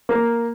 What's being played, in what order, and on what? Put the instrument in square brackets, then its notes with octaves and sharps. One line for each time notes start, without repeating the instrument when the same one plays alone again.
[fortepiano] A#3